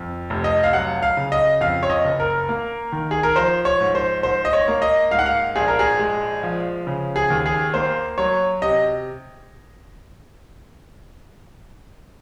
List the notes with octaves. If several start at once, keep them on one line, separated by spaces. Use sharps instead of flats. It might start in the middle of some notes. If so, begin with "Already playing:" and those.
Already playing: F2
F1
D#5
F5
F#3 F#5
F5
C#3
D#5
F2 F5
C#5
D#5
F#1
A#4
A#3
D#3
G#4
A#4
F3 C5
C#5
G#2
C5
G#2 C5
D#5
C#5
A#3
D#5
G#2 F5
F#5
F5
A#1 G#4
A#4
G#4
G#3
F3
C#3
G#4
D#2
G#4
A#3 C5
F#3 C#5
C3 D#5